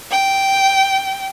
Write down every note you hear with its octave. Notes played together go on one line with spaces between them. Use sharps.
G5